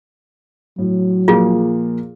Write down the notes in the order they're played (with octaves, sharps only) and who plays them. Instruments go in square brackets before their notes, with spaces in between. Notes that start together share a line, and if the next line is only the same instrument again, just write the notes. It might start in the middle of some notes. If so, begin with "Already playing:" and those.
[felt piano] A2 [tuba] F#3
[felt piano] A#2 F3 A#3 [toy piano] F4 G#4